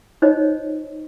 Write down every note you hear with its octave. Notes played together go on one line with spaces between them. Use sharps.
D#4 F4 C5 C#5 D#5